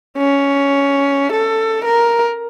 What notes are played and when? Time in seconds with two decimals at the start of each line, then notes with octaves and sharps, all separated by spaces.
0.18 C#4
1.33 A4
1.85 A#4